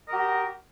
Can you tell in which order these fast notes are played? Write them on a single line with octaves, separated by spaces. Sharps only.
D#5 A#4 G4 F#4